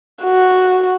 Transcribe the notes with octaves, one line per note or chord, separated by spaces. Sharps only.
F#4